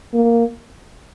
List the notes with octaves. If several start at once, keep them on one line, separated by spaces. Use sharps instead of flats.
A#3